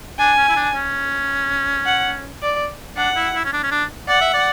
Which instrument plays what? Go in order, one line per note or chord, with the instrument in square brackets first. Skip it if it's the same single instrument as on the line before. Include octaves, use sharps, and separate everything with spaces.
[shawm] D4 [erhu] G#5
[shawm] C#4
E4
D4
C#4
[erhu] F#5
D5
[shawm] D4 [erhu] F#5
[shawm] E4
E4
C#4
D4
C#4
D4
[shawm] D5 [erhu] F#5
[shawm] E5
D5